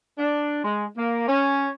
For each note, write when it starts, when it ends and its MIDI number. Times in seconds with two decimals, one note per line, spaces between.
0.18 0.62 62
0.64 0.86 56
0.97 1.27 58
1.28 1.70 61